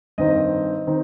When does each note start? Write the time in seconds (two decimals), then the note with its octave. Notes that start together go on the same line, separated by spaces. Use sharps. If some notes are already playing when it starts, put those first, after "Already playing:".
0.18 G2 D#3 C4 D#4 D#5
0.87 D#3 C4 D#4